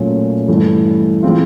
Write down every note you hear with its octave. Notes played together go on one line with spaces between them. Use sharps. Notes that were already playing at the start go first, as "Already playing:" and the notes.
Already playing: A#2 F#3 A3 C#4
G2 E3 A3
E3 G#3 C4 F4